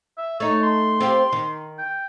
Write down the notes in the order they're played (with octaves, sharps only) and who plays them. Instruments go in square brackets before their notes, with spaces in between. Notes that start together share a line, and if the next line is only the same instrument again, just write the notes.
[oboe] E5
[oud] A3 D#4 [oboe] C#5
[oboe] C6
[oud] C4 F4 G4
D#3
[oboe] G5